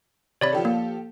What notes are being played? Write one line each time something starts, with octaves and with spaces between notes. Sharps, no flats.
C3 C#5 D5 B5
F3 G4 A4
A#3